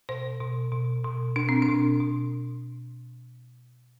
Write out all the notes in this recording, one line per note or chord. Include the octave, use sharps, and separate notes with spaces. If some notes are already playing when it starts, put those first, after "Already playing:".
B2 C5
B2
B2
B2
B2 D4
C4
D4
B2
B2